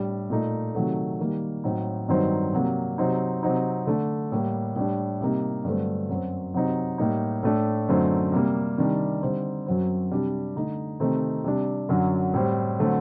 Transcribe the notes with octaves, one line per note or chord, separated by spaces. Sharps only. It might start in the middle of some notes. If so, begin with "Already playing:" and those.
Already playing: A2 G3 D4
A#2 A3 D#4
C3 D#3 F#3 A3
D#3 G3 A#3
A2 F#3 C4 D#4
G2 D#3 F#3 C4 D#4
C3 F#3 A#3
C3 F#3 C4 D#4
C3 F#3 C4 D#4
D3 A3 D4
A2 G3 A#3
A2 G3 D4
C3 G3 A#3 D#4
G2 D3 F#3 A3 C4
F#2 F#3 C4
C3 F#3 C4 D#4
A2 G3 A#3 D#4
A2 A3 D4
F#2 D3 A3 C4 D#4
C3 G3 A#3
C3 D#3 G3 D4
D3 G3 C4 D#4
F#2 F#3 C4
C3 G3 D4
D3 A3 D#4
C3 D#3 A3 C4 D#4
C3 G3 D4
F#2 D3 F#3
A2 G3 C4
D3 F#3 A3 C4